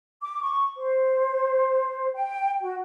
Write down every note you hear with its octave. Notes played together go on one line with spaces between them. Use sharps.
D6
C#6
C5
G5
F#4